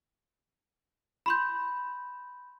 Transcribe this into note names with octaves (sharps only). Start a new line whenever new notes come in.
B5 C6 G6